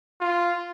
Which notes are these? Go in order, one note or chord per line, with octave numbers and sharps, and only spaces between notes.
F4